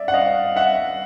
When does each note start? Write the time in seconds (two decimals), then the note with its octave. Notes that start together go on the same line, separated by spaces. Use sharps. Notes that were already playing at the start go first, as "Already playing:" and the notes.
Already playing: D5 E5
0.08 F#5
0.14 D#5 F5
0.56 E5 F#5